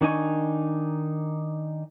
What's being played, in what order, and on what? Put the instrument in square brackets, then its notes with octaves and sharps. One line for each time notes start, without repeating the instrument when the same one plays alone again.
[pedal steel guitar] D#3 D4 D#4 G#5 C#6